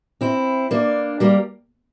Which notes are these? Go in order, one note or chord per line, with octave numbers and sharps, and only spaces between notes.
C4 E4
A#3 D4
G3 A#3